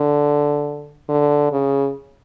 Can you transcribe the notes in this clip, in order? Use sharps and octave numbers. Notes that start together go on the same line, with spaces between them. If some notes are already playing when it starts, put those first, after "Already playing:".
Already playing: D3
D3
C#3